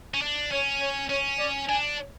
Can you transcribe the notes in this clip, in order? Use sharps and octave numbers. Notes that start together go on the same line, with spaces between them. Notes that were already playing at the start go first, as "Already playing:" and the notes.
C#4
D4
C#4 C#5
C#5
C#4 C#5
D5
D4 G#5